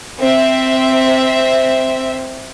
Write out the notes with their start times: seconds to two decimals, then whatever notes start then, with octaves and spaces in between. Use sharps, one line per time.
0.20 C4 E5